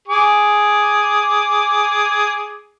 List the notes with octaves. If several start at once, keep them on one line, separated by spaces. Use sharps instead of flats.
G#4 D6